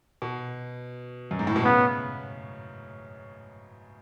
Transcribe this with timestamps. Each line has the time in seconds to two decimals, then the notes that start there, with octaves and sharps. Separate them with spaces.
0.22 B2
1.31 F#2
1.39 G#2
1.47 A2
1.56 B2
1.64 C#3 B3